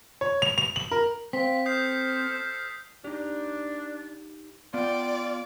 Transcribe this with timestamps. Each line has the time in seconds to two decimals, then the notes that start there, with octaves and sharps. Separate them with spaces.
0.21 C#5
0.42 F7
0.58 F7
0.76 F#7
0.91 A#4
1.33 C4 F5 G5 B6
1.66 A4 C5 D#6 F6 G6 C7
3.04 D4 D#4 G4
4.74 B3 F4 D5 G5